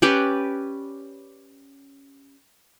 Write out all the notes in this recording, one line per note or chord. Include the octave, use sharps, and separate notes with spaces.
C#4 G4 B4 D5